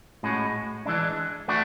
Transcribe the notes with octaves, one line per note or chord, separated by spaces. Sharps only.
A2 G#3 C#4 F#4
E3 G#3 D4
A3 D4 F#4